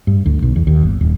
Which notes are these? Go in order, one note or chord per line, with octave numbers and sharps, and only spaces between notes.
G2
D2
B1
E2
D#2
G1
D#1